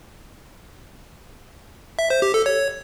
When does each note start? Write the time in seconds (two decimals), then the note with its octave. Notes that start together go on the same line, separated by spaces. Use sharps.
1.99 E5
2.10 C5
2.22 G4
2.34 A4
2.46 C#5